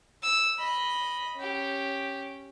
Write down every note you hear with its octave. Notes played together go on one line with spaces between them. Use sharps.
E6
D#5 B5
C#4 G4